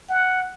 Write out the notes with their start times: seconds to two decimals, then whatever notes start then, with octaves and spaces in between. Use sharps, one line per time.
0.09 F#5